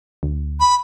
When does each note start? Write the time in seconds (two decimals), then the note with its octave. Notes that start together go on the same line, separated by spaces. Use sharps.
0.23 D2
0.60 B5